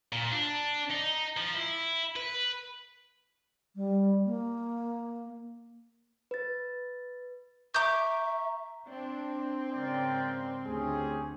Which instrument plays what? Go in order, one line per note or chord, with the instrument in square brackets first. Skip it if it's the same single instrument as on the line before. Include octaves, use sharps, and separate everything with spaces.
[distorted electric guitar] A#2
D4
D#4
F3
E4
B4
[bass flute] G3
A#3
[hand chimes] B4 A6
[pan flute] E5 [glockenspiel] A#5 C#6 [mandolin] D6 G6
[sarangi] C4 [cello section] D4
[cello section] G#2 C#3 [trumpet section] A#4 D5 G5
[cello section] D2 [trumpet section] C#4 G4 G#4